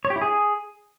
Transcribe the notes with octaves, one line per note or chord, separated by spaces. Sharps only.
C#5
G4
E4
G#4